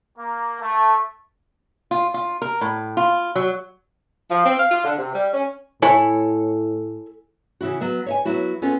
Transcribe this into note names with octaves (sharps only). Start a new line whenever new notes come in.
A#3
A3
F4
F4
A#4
A2
F4
F#3
F3
C4
F5
F4
D3
C3
G3
C#4
A2 E4 A4 C#5 G#5
C#3 E3 E4 F#4
F#3 B3 E5
C#5 E5 G#5
F#3 B3 E4 F#4
B3 C#4 F4 A4